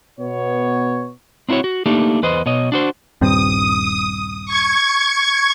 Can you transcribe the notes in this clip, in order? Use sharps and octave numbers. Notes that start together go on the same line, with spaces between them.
B2 B3 C#5
C4 D4 E4 F#4 C#5
F#4
A3 A#3 D4 D#4 G4
E2 B4 C5 D#5
B2 C#5 D#5
D4 F#4 C5
D#1 G2 C4 D#6
C#6 G#6